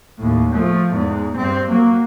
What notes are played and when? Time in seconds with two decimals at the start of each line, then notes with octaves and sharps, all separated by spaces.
0.19 D#2 A2
0.54 F3 A3
0.92 E2 G#2
1.36 G2 C4
1.69 F#3 A#3